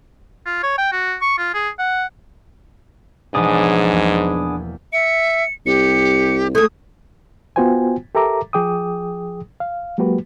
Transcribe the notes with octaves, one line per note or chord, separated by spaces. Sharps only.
F4
C#5
G5
F#4
C#6
F4
G#4
F#5
B1 G#2 E3 F3 B3 D4 G#4
E1 E2 A#3
E5 C#7
C2 G4 C#7
A3 A4 D#6 G#6
B3 F4 F#4 C5 G5 G#5
G4 A4 A#4 E5 A#5 D6
F3 G#4 G5 D6 D#6
F5
F#3 G#3 A#3 F#4 G4 B4